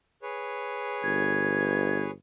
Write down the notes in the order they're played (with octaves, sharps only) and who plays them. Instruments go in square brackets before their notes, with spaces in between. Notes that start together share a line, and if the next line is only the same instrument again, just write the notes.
[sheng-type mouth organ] G#4 B4 C#5
[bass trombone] G1 [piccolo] G#6